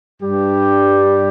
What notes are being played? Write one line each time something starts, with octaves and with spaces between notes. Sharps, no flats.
G2 G3 D4 G4